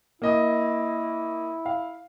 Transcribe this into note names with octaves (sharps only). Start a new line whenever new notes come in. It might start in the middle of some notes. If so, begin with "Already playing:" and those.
A#3 E4 D#5 D#6
F5